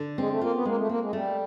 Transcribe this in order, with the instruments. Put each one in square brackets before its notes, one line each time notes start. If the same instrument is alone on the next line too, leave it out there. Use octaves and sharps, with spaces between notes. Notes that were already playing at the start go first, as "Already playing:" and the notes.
Already playing: [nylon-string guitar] D3
[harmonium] G#3 [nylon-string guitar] C4
[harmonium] A3
[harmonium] A#3 [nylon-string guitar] F4
[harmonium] B3
[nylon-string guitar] G#3 [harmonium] A#3
[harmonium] A3
[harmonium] A#3 [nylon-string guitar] C4
[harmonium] G#3
[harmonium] G3 [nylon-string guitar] A3